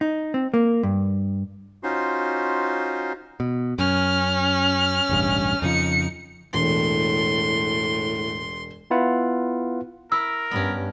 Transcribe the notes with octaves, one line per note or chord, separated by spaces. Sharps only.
D#4
C4
A#3
G2
C#4 D#4 F4 F#4 C5 C6
B2
F#2 C#4 F6
E1 A1 G2
F2 C#3 F3 D#4 C#7
E1 A2 C6
B3 E4 F4 B4 F#5
E4 A#4 E6
G2 B3 C#4